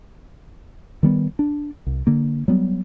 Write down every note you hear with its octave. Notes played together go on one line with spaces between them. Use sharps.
D#3 G3 B3
D4
C2
D3 A#3
F#3 G3 B3